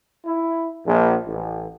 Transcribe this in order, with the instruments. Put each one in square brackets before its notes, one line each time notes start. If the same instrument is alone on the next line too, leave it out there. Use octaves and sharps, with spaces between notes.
[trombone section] E4
A#1
A1